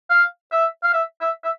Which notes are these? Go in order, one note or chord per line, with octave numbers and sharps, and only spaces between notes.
F5
E5
F5
E5
E5
E5